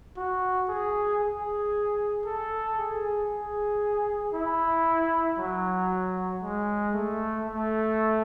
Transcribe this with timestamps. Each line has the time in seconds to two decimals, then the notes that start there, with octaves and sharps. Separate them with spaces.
0.17 F#4
0.69 G#4
1.22 G#4
2.26 A4
2.78 G#4
3.30 G#4
4.34 E4
5.38 F#3
6.43 G#3
6.94 A3
7.47 A3